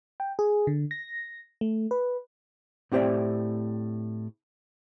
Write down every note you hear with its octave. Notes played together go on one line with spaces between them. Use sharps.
G5
G#4
D3
A#6
A3
B4
A2 C4 G4 C5 D5 E5